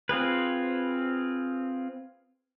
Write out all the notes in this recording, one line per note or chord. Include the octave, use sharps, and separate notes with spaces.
C4 F4 G#4 B4